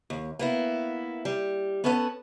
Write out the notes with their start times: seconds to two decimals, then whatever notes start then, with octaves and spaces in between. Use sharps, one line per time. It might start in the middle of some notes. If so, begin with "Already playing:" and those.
0.10 D#2
0.39 A#3 B3 E4
1.25 G3
1.84 B3 C#4 A4 B4 F5 F#5